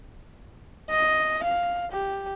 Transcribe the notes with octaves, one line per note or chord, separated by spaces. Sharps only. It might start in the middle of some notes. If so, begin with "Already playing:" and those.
D#5
F5
G4